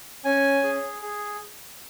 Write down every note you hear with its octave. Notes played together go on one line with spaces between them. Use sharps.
C#4 G#5
G#4
G#4